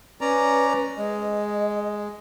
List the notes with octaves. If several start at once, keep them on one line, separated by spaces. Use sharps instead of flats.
C#4 B4 D5 A#5
G#3 D#5